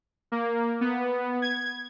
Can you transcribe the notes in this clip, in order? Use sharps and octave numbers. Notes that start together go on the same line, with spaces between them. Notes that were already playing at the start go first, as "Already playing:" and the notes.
A#3
B3
G#6